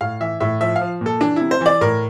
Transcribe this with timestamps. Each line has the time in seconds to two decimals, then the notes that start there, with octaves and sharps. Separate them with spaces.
0.01 A2 F5
0.21 E3 E5
0.40 A2 E5
0.61 F3 E5
0.76 F5
0.81 F3
1.01 A#2 A4
1.21 E3 D4
1.36 C3 E4
1.51 C5
1.61 E3 D5
1.81 A2 A#4